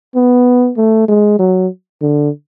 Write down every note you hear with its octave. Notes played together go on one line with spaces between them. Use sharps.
B3
A3
G#3
F#3
D3